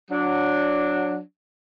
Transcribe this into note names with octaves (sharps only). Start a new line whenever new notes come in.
F#3 D4